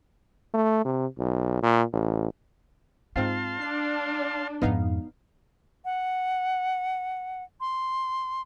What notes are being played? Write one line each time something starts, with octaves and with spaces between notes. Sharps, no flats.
A3
C3
B1
A#2
A1
G#2 C4 D#4 F4 F5 A5 C6
D4 C7
F2 G#2 B3 D#4 F5
F#5
C6